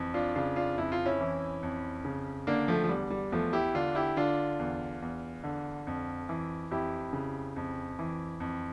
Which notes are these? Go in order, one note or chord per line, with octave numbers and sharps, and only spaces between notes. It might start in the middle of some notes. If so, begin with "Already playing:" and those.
Already playing: F2 E3
D4 F4
C#3 D4 F4
D4 F4
F2 E4
F4
C#4 E4
E3
F2
C#3
D3 A#3 D4
F3 A3
F3
E2 G3
G3
E2 F3 A3
E4 G4
D3 D4 F4
E4 G4
D3 D4 F4
E2
E2
D3
F2
E3
F2 E4 G4
C#3
F2
E3
F2